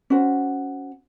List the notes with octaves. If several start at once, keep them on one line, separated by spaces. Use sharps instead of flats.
C#4 F#4 C5